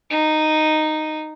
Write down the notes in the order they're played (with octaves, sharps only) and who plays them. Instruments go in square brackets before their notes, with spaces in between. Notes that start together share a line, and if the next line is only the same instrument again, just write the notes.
[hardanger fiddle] D#4